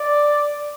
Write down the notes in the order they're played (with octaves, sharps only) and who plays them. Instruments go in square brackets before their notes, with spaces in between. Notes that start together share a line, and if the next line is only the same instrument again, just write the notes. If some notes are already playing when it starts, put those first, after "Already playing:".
Already playing: [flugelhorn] D5